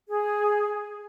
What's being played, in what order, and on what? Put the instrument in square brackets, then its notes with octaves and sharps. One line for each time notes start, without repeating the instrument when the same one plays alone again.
[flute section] G#4